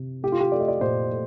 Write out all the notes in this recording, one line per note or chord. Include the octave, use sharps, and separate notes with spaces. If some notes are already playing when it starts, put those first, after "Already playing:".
Already playing: C3
A3 G4
F4
G4
A3 D5
D#5
D5
A#2 C5
A3